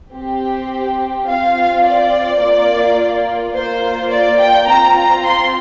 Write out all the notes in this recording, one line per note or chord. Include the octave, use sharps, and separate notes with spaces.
C4 G4
C4 F4 F5
D5
A#3 F4
A#3 F4 C5
D5
G5
C4 F4 A#5
A#5
C6